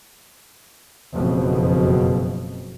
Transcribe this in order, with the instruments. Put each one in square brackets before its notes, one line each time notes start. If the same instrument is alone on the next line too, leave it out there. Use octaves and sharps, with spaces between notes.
[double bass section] F#1 F2 B2